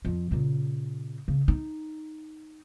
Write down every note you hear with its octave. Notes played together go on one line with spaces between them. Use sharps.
F2 F3
A#2 C#3
C#3
D#4